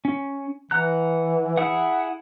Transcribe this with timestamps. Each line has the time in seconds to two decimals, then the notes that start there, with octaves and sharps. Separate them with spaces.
0.05 C#4
0.71 E3 F#5 A#5 F#6
1.57 E4 G#4 F#5